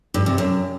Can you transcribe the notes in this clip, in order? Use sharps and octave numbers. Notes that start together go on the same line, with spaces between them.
G2
C3
F#2